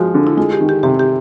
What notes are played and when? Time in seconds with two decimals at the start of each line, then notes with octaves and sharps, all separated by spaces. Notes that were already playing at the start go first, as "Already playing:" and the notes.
Already playing: F3 G#3 F#4
0.15 D3
0.27 E4
0.37 G#3 F4
0.53 G4
0.61 D#3
0.69 G4
0.83 C3 G4
0.99 G4